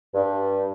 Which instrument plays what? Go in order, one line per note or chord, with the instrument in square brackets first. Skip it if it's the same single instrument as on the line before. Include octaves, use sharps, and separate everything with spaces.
[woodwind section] G2